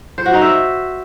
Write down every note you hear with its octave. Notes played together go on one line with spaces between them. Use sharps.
C5
F#4
D#4
E5